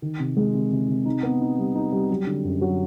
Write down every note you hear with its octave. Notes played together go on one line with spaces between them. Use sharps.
D#3
C3
G#3
C3
C3
C3
D#4
B3
D#4
G3
D#4
G3
F#3
D3
F#2
F#3